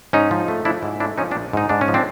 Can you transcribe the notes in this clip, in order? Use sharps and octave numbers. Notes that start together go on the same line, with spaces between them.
G#2 C#4 D#4
F3
A3
F3 D4 E4
G#2
A3 D4 E4
F3 C#4 D#4
C4 D4
A#1
G#2 D#4
G#2 D4
C#4
F3
C4 D4